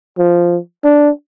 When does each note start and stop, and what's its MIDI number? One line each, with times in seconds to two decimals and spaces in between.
0.18 0.58 53
0.84 1.09 62